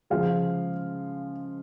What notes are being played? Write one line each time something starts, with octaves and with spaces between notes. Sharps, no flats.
C#3 F3 G#3 F5